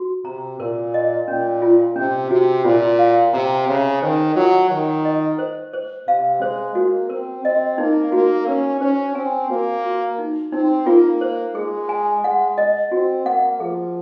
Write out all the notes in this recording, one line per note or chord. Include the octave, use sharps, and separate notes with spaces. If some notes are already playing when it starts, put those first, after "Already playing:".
Already playing: F#4
C3 A#5
A#2 A#4
D#5
A#2 C#4
F4
C3 C#4
C3 F#4
A#2 F4
F5
C3 A#5
C#3 A#5
D#3 C5
F#3 F4
D#3 F#5
D#5
C5
C5
C3 F5
G#3 C5
A#3 F#4
C4 A#4
C4 D#5
A#3 D#4
A#3 F#4
C#4 A#4
C#4 C5
C4 G#5
A#3 F#4
F#4
D#4
C4 D#4
A#3 F4
C5
G#3 G#4
G#5
G#3 F#5
D#5
C4 F#4
A#3 F#5
F3 G#4